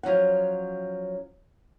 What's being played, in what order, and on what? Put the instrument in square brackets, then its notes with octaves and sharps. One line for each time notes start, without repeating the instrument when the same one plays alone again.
[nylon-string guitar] F3 F#3 C#4 F#5